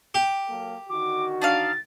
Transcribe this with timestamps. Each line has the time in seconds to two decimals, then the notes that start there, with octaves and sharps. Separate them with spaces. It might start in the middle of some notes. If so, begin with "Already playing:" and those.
0.14 G4
0.49 F#3 A#3 A4
0.90 D3 D#3 F#4 D6
1.42 D4 D#4 F5 A6